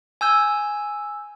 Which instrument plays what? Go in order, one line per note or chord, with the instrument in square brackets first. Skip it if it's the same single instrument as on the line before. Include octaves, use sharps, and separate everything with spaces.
[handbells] G#5 E6 G6